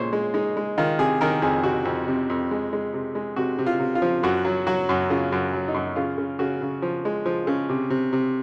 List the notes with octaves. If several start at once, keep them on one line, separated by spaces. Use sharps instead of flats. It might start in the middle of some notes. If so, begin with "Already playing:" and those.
Already playing: A#2 G#3 C5 C#5
G#3
G#3 D#4
G#3
D#3 F4
C3 G#4
D#3 A#4
F2 G#4
C3 F#4
F2
C3
F2
G#3
G#3
C3
G#3
C3 F#4
C3
F4
C3
F4
F3
F#2 F#4
F#3
F#3 F#4
F#2
C#3 F4
F#2
F#3
D#4
F#2
C#3 F4
C#3
C#3 F#4
C#3
F3
G#3
F3
C#3
C3
C3
C3